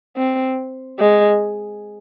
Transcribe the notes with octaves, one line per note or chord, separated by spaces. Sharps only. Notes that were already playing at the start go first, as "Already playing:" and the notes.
C4
G#3